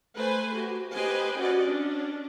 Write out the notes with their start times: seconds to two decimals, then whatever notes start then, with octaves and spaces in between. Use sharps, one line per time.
0.17 A3 B4 C5 G#5
0.55 F#4 G4
0.95 G4 B4 C5 D#5 G5 G#5
1.39 C#4 F#4 D5 D#5
1.67 C#4 D4